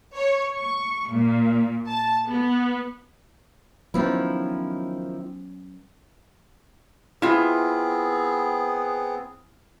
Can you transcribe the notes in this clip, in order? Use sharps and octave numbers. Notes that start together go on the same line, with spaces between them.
C#5
C#6
A#2
A5
B3
D#3 F3 F#3 B3 C#4 E4
B3 C4 E4 F4 G#4